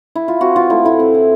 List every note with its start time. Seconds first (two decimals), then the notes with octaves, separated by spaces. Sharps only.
0.15 E4
0.28 F4
0.41 C4 F#4
0.56 E3 F4
0.70 A3 E4
0.85 A2 E4
0.99 C4
1.14 E3